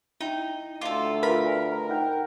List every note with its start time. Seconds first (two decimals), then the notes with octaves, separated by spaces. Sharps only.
0.21 D#4 E4 G5
0.81 D2 F4 A4 D6
1.23 F4 A#4 B4 B5
1.89 D#4 F#5 G5